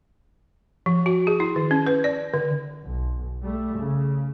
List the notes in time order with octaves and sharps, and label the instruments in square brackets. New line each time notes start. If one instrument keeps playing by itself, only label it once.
[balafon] F3
F#4
G#4
E4
D#3
C#4
B4
D5
D3
[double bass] B1
G3 A3
C#3